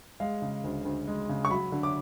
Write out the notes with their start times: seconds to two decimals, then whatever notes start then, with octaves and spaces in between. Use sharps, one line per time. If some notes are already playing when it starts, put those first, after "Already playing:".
0.20 G#3 F5
0.42 C#3
0.64 D2
0.85 D2
1.08 G#3
1.29 C#3
1.45 C#6
1.51 F#3 B5
1.72 D3
1.83 D6